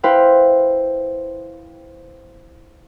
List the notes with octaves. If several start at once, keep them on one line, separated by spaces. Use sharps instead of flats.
E4 B4 C5 F5 G5